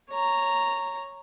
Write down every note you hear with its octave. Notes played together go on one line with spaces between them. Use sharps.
C#5 A#5